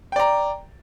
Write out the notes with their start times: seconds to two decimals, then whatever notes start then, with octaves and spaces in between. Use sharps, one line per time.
0.12 G5
0.16 D5
0.20 A#5